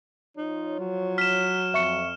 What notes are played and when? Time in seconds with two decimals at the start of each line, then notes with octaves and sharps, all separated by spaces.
0.37 F3 D#4 F4 C#5
0.79 F#3
1.18 F6 B6 E7
1.74 F2 E5 C#6 C#7